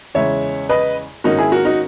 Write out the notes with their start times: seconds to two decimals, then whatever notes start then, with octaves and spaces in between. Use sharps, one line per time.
0.15 E2 C#3 G#3 C#5 E5
0.69 B4 D#5
1.24 G#2 D#3 A#3 C#4 D#4 F#4
1.39 E4 G#4
1.52 F#4 A#4
1.65 D#4 F#4